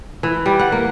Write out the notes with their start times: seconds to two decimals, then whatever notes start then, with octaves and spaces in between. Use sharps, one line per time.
0.23 E3
0.46 G3
0.59 F#5
0.72 A#3